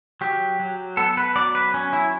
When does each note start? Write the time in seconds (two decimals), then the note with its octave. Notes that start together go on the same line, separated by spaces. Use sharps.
0.21 F#3 G4
0.60 F#3
0.97 B3 A4
1.17 B4
1.35 F#3 D5
1.55 B4
1.74 C#4
1.93 E4